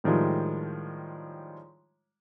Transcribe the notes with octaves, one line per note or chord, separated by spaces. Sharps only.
A2 D#3 F3 G3 G#3